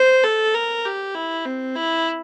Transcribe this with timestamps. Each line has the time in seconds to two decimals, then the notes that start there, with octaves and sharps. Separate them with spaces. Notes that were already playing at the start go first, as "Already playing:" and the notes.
Already playing: C5
0.24 A4
0.54 A#4
0.85 G4
1.15 E4
1.45 C4
1.76 E4